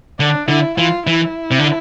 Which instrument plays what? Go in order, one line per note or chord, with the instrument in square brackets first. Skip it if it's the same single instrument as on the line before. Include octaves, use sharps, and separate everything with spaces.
[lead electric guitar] D3 [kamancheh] D4
[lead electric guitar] D3 [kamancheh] E4
[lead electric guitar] E3 [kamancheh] F4
[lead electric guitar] E3 [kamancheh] E4
[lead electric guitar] C3
D3